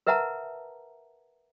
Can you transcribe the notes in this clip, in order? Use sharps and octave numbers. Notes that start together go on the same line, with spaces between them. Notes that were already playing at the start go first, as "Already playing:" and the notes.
A#4 B4 E5 F#5 A5 A#5